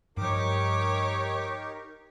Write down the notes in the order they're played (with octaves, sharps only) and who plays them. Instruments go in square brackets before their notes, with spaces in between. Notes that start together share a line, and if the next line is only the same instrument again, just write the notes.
[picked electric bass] G2 F3 [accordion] D#4 G4 A#4 [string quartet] C#5 D6